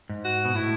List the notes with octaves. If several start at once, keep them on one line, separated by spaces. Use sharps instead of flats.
G#2
F#4
B2
A2 E4